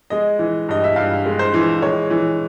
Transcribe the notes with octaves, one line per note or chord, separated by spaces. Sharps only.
G#3 D#5
E3
G2 D#5
E5
G2 F5
G#3
C5
E3
G#3 C#5
E3